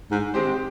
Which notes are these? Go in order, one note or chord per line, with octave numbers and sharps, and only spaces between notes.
G#2
D#3 G#3 C4 G4 C5